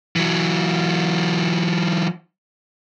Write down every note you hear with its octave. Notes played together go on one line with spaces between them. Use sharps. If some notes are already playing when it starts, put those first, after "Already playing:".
E3 F#3